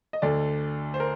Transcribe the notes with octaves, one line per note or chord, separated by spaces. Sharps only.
D#5
D2 D3 D5
C5
A#4